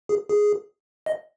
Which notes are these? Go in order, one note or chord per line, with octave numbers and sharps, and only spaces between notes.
G#4
G#4
D#5